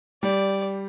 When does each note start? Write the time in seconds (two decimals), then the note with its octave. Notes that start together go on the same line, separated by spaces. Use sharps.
0.23 G3 D5